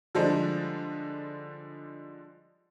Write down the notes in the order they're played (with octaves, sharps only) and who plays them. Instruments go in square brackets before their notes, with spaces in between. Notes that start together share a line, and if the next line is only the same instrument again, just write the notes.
[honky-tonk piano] D3 F3 G3 G#3 D4 D#4